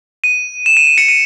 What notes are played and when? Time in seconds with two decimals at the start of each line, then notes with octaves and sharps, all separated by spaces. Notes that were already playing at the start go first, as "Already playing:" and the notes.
0.24 D#7
0.66 E7
0.77 D#7
0.87 D#7
0.98 C#7
1.08 D#7